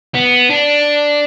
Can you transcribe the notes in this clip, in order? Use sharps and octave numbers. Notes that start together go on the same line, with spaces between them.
B3
D4